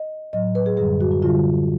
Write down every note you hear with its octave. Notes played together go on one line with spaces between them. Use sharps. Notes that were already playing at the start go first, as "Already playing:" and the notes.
Already playing: D#5
A2 F#3 D#5
B4
G#4
F#2 D3 G3 G#4
F#4
F#4
D3 G3 F4